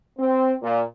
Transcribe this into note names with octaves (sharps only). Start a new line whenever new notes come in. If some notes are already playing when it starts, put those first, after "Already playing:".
C4
A#2